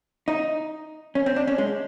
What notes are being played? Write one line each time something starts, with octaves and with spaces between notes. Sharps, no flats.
D#4
C#4
C4
D4
C#4
G#3